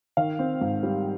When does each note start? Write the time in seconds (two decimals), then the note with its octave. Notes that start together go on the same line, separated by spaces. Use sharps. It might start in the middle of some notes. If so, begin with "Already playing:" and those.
0.17 D#3 F5
0.39 C4
0.61 G#2
0.83 G3